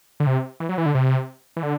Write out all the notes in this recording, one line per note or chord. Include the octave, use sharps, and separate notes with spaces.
D3
C3
E3
F#3
E3
D3
C3
E3
D3